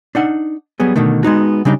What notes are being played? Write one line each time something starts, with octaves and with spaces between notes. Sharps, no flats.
D4 D#4 F#5
F#3 G3 B3 G#4
B2 D3 D#3 A3
G#3 B3 D#4 F#4
C#3 G3 D4 D#4